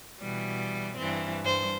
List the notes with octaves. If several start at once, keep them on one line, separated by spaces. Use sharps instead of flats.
B2 E3 G3
G2 E3 C4
G2 C5